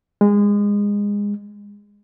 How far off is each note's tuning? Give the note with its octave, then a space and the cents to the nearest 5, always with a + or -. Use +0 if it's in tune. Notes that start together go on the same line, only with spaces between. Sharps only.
G#3 -25